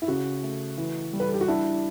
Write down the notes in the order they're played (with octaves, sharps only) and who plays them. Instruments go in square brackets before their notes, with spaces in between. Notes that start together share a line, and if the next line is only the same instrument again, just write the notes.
[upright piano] E4
[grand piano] C#3 [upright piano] F#4
[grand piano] A3
E3
G3
[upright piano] B4
A4
G4
F#4
[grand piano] D4 [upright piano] E4